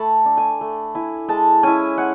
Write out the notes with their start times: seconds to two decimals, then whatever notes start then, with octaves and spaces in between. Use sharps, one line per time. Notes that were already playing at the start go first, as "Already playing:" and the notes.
Already playing: A3 A5 B5
0.25 D4
0.37 G#5
0.61 A3
0.95 E4 G#5
1.28 G#3 A5
1.63 C#4 E4 G#5
1.97 G#3 F#5